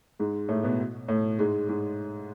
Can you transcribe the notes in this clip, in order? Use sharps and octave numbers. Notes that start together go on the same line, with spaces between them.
G#2 G#3
A2 A3
B2 B3
A2 A3
G#2 G#3
G#2 G#3